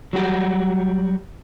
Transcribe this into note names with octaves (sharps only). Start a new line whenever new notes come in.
F#3 G3 F#4 G4